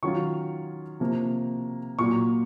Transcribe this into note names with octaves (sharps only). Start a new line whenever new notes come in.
D#3 F#3 C#4 F4 C#6
C3 F3 A#3
A#2 F#3 A#3 C#6